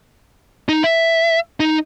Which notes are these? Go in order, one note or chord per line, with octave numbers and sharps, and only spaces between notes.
D#4
E5
D#4